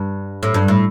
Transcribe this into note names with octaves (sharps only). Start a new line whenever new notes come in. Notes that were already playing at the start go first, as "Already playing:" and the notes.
Already playing: G2
A2
G2
A2